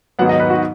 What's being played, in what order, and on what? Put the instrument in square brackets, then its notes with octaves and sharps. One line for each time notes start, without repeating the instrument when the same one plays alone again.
[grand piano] G#2 D#3 F#3 B3 F#5
D#5
B4
F#4